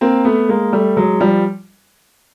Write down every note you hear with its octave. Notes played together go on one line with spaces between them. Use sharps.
A#3 C4
A3 B3
G#3 A#3
G3 A3
F#3 G#3
F3 G3